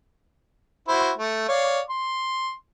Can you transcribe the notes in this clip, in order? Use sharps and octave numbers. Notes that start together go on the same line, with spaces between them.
E4 F#4 C5
A3
C#5 D5 F5
C6